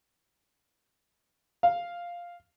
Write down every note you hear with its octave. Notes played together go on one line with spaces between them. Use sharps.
F5